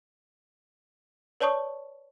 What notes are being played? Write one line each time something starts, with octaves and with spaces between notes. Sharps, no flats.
B4 C#5 D5 A5 C#6 D#6